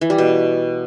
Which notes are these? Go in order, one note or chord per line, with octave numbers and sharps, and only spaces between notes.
E3
G3
B2